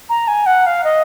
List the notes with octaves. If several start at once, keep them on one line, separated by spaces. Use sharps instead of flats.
A#5
G#5
F#5
F5
D#5